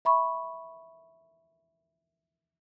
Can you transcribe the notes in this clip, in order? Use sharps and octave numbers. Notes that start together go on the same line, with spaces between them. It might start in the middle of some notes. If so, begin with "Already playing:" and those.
E5 B5 C#6